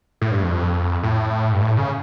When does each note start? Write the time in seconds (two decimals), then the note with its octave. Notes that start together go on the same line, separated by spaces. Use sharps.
0.21 A2
0.31 G2
0.43 F2
1.03 A2
1.52 G2
1.62 A2
1.77 C#3